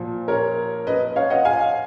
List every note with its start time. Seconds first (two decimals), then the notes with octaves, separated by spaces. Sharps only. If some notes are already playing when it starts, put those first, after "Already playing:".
Already playing: A#2 F3
0.28 A#4 C#5
0.87 B4 D#5
1.16 C#5 F5
1.30 D#5 F#5
1.45 F5 G#5